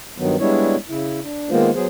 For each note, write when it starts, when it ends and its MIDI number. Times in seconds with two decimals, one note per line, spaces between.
0.18 0.36 43
0.18 0.36 51
0.18 0.36 54
0.18 0.36 59
0.40 0.76 55
0.40 0.76 56
0.40 0.76 59
0.40 0.76 62
0.40 0.76 64
0.40 0.76 73
0.89 1.20 49
0.89 1.20 64
1.23 1.50 62
1.50 1.70 51
1.50 1.70 56
1.50 1.70 58
1.50 1.70 59
1.50 1.70 65
1.50 1.70 72
1.75 1.87 54
1.75 1.87 59
1.75 1.87 68
1.75 1.87 72